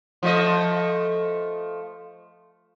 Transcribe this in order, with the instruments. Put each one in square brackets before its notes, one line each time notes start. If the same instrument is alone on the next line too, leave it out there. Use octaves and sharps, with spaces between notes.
[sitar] F3 A3 D#5